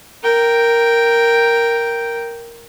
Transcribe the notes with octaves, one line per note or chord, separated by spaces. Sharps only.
A#4 G5